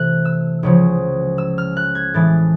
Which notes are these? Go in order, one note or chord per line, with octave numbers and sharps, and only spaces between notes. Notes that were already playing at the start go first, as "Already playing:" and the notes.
Already playing: C3 E3 A3 F#6
E6
C#2 C#3 F3
E6
F6
F#6
G#6
A2 E3 G#3 A6